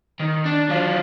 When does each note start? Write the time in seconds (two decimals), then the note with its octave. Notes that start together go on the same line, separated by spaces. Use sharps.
0.20 D#3
0.45 D4
0.69 F#3 F4